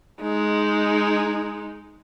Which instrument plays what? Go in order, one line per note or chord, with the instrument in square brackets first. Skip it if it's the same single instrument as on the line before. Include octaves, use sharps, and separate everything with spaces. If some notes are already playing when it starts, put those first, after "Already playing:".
[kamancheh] G#3 D#4